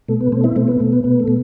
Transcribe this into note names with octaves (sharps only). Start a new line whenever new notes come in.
B2 A3
B3
B2 A3 C4
C4 E4
B2 A3 C4
B3
B2 A3
B3
B2 B3
A3
B2